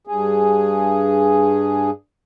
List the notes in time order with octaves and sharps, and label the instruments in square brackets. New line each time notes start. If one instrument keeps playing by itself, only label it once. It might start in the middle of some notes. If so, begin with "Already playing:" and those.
[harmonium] G2 G#4